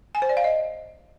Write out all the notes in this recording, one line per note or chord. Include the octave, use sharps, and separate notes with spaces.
G#5
C5
D5
F5
D#5